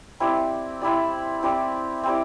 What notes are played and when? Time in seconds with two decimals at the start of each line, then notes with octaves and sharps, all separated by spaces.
0.20 C4 E4 G4 D5
0.81 C4 E4 G4 D5
1.43 C4 E4 G4 D5
2.03 C4 E4 G4 D5